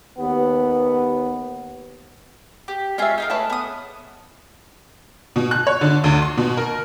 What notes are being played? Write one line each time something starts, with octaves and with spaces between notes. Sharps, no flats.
D#2 B3
G4
G#3 C#4 F4 G#4 E5
D#4 F4 A#4
A3 G#4 A4 B4 C#5
B3 D#6
B2
F#6
C#5
D3
D2
C6
B2
A#4